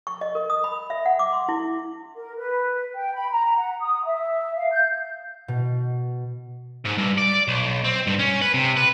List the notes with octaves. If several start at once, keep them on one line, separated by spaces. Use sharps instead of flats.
C#6
D#5
A#4
D#6
B5
E5
F#5
D6
C6
E4
A#4
B4
G5
B5
A#5
F#5
D#6
E5
F5
G6
B2
G#2
G2
D5
B1
C4
G2
C#4
B4
C3
B4